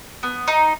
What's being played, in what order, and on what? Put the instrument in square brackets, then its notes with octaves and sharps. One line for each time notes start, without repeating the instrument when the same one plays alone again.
[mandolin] B3
D#4